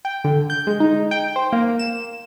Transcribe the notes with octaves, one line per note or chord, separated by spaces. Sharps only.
G5
D3
G6
G#3
D#4
G5
C5
A#3
E7